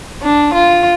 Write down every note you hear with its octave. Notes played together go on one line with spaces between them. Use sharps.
D4
F4